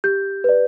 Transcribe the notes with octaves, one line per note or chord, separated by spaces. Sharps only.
G4 G6
B4 D5